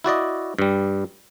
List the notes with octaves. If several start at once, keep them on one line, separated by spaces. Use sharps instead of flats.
E4 F#4 D5 D#5
G2 G3